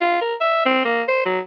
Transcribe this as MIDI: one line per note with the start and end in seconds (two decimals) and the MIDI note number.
0.01 0.21 65
0.21 0.35 70
0.41 0.66 76
0.66 0.83 60
0.85 1.03 58
1.08 1.22 72
1.26 1.40 54